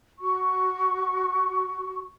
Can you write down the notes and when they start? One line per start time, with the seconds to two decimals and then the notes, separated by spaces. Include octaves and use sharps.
0.19 F#4 C#6